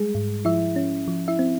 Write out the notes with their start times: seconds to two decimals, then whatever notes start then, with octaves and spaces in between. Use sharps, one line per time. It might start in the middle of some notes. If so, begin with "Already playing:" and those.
Already playing: G3 G#3 G#4
0.15 G#2
0.45 F3 E4 E5
0.76 C#4
1.08 F3
1.28 E4 E5
1.39 C4